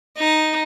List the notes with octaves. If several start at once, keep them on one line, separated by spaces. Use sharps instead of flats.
D#4